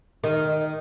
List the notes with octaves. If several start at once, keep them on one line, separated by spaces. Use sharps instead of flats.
D#3